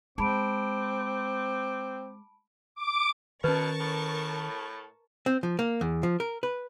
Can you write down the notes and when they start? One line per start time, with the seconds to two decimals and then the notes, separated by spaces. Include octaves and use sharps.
0.18 G#3 C4 A5 B5 D6 D7
2.75 D6
3.44 B2 D#3 C#4 A#4 B4 A5 C#6
3.80 A2
5.26 C4
5.43 F3
5.59 A#3
5.81 E2
6.03 F3
6.20 A#4
6.43 B4